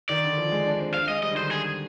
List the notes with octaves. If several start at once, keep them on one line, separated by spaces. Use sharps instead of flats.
D#3 D5
D3
F3
G#3
D4
C4
C4 F5
G#3 D#5
G3 D#5
D3
D#3 C5
G#4